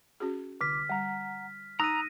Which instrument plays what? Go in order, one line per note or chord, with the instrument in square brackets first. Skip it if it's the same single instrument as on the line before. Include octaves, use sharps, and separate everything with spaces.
[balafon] C#4 F#4 G#4
[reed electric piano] C2 D6 [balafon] D3 [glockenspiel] F6 B6
[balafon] G3 [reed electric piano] F#5 A#5
[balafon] D#4 [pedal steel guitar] A#5 [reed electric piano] D#6 E6 F#6 [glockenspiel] A#6 D#7